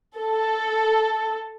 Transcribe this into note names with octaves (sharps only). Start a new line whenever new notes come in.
A4